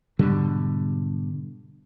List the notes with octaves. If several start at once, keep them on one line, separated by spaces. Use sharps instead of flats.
G#2 B2 D3 G3